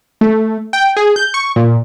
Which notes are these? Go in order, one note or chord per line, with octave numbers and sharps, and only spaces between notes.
A3
G5
G#4
G6
C#6
A#2